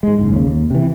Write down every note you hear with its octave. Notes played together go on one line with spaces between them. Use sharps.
G#2 G#3
F#1 G#2
D#2 C#3
D#2
C3 E3